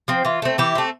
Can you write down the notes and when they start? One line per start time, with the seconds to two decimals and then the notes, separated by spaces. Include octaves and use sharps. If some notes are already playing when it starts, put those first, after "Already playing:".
0.08 F3 C4
0.25 E3 F4
0.42 A3 C4
0.58 E3 E4 G4
0.75 A3 C4